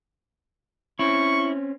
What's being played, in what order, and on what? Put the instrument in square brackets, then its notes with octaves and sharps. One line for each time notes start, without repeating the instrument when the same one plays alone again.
[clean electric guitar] C4 C#4 [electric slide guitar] E4 [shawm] C#6